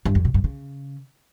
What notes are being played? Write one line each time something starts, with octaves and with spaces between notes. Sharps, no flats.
G2
F2
B2
G2
C#3